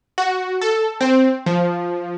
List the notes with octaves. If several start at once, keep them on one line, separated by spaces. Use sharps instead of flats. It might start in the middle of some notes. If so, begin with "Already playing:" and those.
F#4
A4
C4
F3